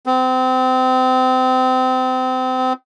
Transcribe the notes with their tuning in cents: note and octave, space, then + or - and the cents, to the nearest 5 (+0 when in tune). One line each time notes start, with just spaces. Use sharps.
C4 -30